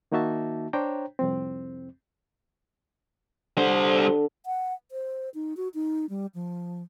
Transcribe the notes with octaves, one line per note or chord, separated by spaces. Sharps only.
D#3 A#3 D#4 F#4 E5 A5
D4 C5 C#5 G5 A#5
C2 F2 C4
D3 G3 C5
F#5
C5
D#4
F#4
D#4
G3
F3